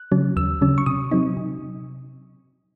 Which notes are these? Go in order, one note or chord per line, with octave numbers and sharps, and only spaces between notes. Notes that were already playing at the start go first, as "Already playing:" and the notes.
Already playing: F#6
C#3 F#3 C#4
D#2 E6
C#3 F#3 C#4
C#6
C3 D#6
F#3 C4 D#4
C3